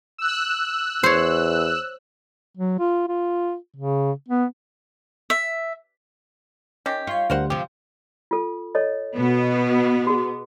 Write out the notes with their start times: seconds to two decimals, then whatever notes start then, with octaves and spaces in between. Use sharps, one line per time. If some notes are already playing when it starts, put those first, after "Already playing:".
0.18 E6 F#6
1.03 E2 C5 C#5
2.57 F#3
2.79 F4
3.08 F4
3.76 C#3
4.28 B3
5.30 E5
6.86 D#3 C#4 G4
7.07 F4 C#5 C6 C#6
7.30 D2 G3 A#4 C5 F#5
7.50 C3 F3 G4
8.31 F4 A4
8.75 A4 C#5 D#5
9.14 B2 B3
10.07 F#4 G#4